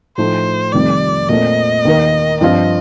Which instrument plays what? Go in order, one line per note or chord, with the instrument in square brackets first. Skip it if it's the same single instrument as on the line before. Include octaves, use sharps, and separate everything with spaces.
[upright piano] A2 F3 A3 D#4 [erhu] C5
[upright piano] F1 F2 D#3 G3 [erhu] D5
[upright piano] A#2 A3 C4 [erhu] D#5
[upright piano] D#2 D#3 A#3
[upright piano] G2 F3 C4 F4 [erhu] D#5